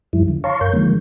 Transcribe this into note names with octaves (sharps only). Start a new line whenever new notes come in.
F#2 F3 G3 E4
D3
C#5 F5 A5 A#5 C6 C#6
F#2 A#4 G6
D3 D#3 F3 G#3 A#3